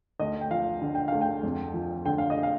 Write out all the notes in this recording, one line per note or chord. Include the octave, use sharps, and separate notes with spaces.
D2 D#5
G5
F3 F5
D3
G5
D2 F5
G5
F2
F3
D3 G5
F5
D#5
F5